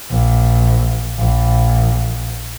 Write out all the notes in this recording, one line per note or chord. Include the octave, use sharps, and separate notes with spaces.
A#1
A#1